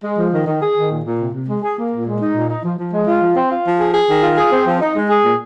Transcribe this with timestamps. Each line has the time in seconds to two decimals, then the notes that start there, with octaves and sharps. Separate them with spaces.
0.03 G#3
0.18 F3
0.33 D#3
0.47 D#3
0.61 G#4
0.75 D#3
0.90 A#2
1.05 A#2
1.20 C3
1.33 C3
1.48 G#3
1.62 G#4
1.77 A#3
1.92 A#2
2.07 G#3
2.21 D#4
2.35 A#2
2.49 D#4
2.64 F3
2.79 F3
2.93 G#3
3.07 F4
3.21 F3
3.36 C4
3.51 F4
3.66 F3
3.79 G#4
3.94 G#4
4.09 D#3
4.23 F4
4.38 G#4
4.52 C4
4.66 F3
4.81 D#4
4.95 G#3
5.10 G#4
5.24 A#2